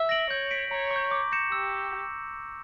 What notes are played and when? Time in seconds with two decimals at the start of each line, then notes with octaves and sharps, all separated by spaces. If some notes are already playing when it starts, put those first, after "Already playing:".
Already playing: E5
0.09 A#6 D7 F#7
0.30 C#5 G6
0.51 B6 D7
0.70 C#5 A#5
0.91 C#6
0.96 G6
1.11 D6
1.32 G6 A#6 C#7 E7
1.52 G4 E6